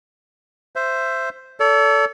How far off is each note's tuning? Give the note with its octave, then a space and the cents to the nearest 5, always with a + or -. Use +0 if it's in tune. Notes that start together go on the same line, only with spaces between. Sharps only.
C5 +0 E5 +15
A4 +10 D5 -45